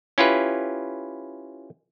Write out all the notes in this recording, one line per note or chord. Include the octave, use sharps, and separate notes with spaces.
C#4 E4 F4 G4 B4